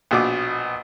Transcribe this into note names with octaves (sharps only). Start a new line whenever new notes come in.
A#1 B2 D6